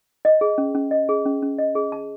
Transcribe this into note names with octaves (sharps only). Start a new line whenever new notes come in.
D#5
G#4
C#4
C#4
D#5
G#4
C#4
C#4
D#5
G#4
A5